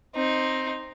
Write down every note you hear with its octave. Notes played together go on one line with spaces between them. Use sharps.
C4 D#4